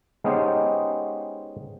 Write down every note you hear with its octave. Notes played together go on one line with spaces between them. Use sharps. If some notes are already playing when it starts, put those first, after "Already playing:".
G#3 B3 C#4 D#4 G4 C5